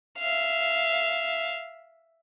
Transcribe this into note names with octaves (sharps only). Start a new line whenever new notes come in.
E5 F5